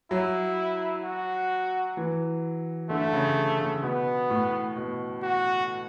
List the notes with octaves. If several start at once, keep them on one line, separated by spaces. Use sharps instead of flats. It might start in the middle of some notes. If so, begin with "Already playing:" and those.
F#3 E4
F#4
E3
D3 A3
C#3
C#3
B2 B3
A2
B2
F#4